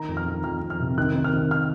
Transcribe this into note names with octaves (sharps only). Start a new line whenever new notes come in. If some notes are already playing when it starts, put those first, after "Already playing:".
Already playing: D#3 A#5
F2
F6
D#3
F2 F6
F2
F6
C3
D#3 F#6
D#3
F6
D#3
F6